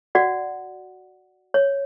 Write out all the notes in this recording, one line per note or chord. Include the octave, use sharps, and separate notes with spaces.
F#4 D5 F#5
C#5